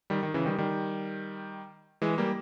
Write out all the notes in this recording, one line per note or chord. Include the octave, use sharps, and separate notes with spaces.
D#3 G3
D#3
C#3 E3
D#3 G3
D#3 G3
E3 G#3
G3 A#3